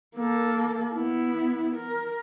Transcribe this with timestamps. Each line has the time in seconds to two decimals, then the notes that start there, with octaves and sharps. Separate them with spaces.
0.16 A#3 A4
0.95 B3 E4
1.76 A#4